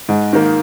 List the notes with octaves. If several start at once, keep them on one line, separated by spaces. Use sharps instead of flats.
G#2
D#3 A#3